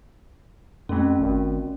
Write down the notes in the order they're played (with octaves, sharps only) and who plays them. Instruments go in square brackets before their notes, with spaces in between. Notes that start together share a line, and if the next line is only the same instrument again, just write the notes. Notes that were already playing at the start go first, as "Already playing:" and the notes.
[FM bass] F2 [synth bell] A3 C#4
[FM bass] G#1